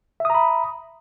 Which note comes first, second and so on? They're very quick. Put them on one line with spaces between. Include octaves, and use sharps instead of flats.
E5 D#6 A#5 B5